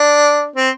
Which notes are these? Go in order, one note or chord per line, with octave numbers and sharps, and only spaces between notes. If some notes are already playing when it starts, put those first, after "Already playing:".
Already playing: D4
C4